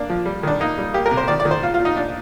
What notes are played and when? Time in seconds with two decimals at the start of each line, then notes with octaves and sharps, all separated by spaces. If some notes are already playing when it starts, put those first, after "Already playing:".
Already playing: A#3 D4
0.10 F3
0.26 G3
0.43 D#3 D4
0.60 A#3 D#4
0.78 G3
0.94 A#3 G4
1.06 A#4
1.11 C3
1.17 C5
1.28 D#3 D5
1.40 D5
1.45 D#3
1.51 C5
1.62 A#2 F4
1.74 F4
1.80 A#2
1.85 D#4
1.96 A#2 D4